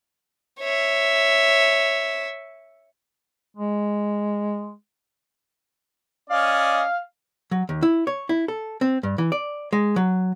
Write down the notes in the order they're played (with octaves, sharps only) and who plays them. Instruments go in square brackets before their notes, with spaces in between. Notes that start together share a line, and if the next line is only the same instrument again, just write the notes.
[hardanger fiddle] C#5 E5
[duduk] G#3
[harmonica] C#4 D5 D#5 [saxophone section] F5
[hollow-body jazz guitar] F#3
D#2
E4
C#5
E4
A4
C4
G2
E3
D5
G#3
F#3